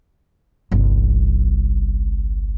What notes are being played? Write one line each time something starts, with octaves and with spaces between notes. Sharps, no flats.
G1 C2